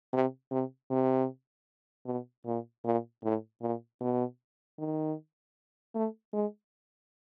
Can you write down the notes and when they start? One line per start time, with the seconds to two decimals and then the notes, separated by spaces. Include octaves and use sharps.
0.13 C3
0.51 C3
0.90 C3
2.06 B2
2.46 A#2
2.85 A#2
3.23 A2
3.62 A#2
4.01 B2
4.78 D#3
5.95 A3
6.33 G#3